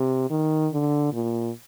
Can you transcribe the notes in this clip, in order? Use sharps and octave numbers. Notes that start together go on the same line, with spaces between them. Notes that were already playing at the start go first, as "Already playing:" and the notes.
Already playing: C3
D#3
D3
A#2